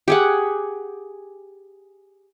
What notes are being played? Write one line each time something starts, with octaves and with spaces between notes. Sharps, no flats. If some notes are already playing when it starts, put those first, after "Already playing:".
G4 G#4 F#5